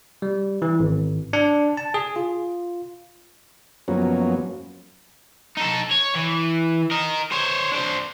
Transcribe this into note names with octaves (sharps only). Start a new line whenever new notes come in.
G3
E3
G#1
D4
A5
G#4
F4
F#2 F3 F#3 A#3 B3 C#4
D#4 A4
C#5
E3
A#4 D#5
C5 C#5
D4 C5